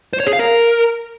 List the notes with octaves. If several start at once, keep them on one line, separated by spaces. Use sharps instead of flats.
C5
C#5
G#4
F5
A#4